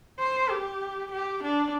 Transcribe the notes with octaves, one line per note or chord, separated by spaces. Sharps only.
C5
G4
G4
D4